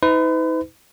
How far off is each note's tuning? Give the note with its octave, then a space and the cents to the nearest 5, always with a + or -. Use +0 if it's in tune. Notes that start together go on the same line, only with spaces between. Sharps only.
D#4 +45 B4 +40